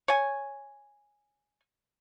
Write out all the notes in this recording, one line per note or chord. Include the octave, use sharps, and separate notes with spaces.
C#5 G#5